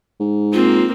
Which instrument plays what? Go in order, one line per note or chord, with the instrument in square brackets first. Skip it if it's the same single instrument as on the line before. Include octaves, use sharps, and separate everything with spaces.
[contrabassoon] G#2
[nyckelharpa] A#3 C4 [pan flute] F4